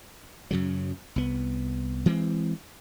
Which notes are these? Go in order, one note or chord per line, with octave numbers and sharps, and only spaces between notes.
F#2 C#3 F#3
C2 B3
E3 G#3 C4